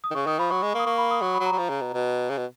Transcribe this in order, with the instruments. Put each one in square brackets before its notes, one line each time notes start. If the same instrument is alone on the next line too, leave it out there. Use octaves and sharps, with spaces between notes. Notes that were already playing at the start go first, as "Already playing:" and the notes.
[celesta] D#6
[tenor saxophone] D#3
[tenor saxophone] C#3 [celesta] C#6
[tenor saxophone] D#3 [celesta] D#6
[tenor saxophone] F3 [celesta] B5
[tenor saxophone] F#3 [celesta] C#6
[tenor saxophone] G#3
A#3
[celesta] D#6
[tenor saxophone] A#3 [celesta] C#6
[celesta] B5
D#6
[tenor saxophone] F#3 [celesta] C#6
[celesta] B5
[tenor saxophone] F#3
[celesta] A#5
[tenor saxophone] F#3
F3
C#3
B2
B2
C#3
B2